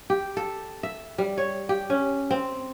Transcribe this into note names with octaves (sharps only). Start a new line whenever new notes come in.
G4
A4
E5
G3
C#5
G4
C#4
C4